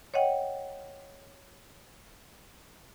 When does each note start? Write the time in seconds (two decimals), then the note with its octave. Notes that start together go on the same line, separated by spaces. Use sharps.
0.14 C#5 D#5 F#5 G5